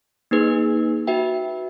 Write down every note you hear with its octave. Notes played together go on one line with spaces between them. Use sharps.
A#3 D#4 G#4 B4
F#4 B4 E5 G5